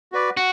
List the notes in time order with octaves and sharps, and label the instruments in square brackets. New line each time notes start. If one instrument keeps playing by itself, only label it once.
[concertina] F#4 B4 D5
[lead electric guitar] F#4